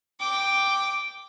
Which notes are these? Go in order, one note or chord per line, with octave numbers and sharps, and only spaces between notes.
G5 D6